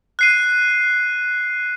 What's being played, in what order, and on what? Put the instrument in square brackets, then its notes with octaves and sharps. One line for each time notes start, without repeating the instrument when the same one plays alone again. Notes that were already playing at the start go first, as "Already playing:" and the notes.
[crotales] F#6 C7 D#7